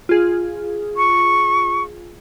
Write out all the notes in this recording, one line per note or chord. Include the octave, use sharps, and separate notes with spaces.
F4 G#4
C#6